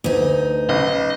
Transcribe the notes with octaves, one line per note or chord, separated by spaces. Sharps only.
D2 D#4 B4
B1 C#3 D#5